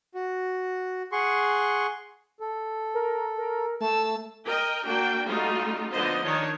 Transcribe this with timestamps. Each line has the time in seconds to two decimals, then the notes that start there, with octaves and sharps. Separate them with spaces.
0.14 F#4
1.12 G#4 F#5 C6 C#6
2.40 A4
2.95 A#4
3.38 A#4
3.81 A3 A5 E6
4.46 A#4 D#5 G5
4.84 A#3 D4 F#4 G5
5.25 G3 A3 C#4 D#4 F4 F#4
5.92 D3 F3 B3 D#4 C5 D#5
6.23 D#3 D4 D#4 C#5